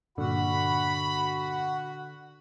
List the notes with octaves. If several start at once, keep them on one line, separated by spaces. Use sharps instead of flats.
G2 A#2 D3 F#4 F#5 B5